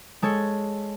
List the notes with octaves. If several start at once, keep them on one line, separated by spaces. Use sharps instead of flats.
G#3 A4 C#5